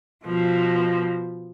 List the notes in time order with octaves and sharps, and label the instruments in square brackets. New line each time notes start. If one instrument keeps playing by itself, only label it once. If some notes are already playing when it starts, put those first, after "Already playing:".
[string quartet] B2 F3